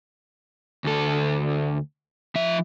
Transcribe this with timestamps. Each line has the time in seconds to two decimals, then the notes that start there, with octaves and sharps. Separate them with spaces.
0.84 D2 A4
2.35 F3 E5